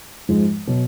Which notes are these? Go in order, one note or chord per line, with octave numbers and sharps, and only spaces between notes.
G#2 F3 G#3
B2 F#3